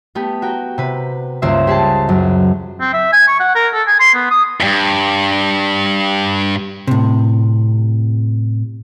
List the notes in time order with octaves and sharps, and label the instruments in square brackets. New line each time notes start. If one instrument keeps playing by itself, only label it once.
[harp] A3 B3 G4
F#4 A#4 G5
C3 B4
C#2 G2 A#3 C5 E5
G4 G#4 A5
F#2 F#3
[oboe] C4
E5
G#5
C#6
F#5
A#4
A4
G#5
C6
B3
D#6
[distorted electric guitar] E2 G2
[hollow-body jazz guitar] A2 C3